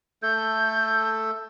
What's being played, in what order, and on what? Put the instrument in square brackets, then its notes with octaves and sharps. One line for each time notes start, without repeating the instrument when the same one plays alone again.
[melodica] A3 A4 [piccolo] G6